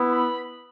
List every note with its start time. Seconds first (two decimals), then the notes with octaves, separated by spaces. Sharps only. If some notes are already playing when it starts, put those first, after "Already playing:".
Already playing: B3 E4
0.10 B5